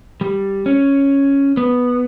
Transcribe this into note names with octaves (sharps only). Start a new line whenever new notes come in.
G3
C#4
B3